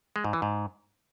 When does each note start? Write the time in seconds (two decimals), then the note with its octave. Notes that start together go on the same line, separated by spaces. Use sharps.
0.16 G#3
0.24 G#2
0.33 E3
0.42 G#2